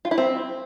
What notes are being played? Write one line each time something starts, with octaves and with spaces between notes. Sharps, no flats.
F4
E4
C4